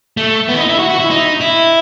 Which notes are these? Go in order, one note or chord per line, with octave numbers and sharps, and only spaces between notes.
A3
B3
E4
D#4
E4
F#4
F#4
E4
D#4
E4